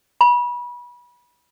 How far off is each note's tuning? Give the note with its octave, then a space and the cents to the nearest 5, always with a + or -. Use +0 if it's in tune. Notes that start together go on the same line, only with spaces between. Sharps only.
B5 -25